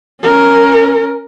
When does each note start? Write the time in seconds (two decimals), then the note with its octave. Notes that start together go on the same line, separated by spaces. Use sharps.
0.22 C#4 A#4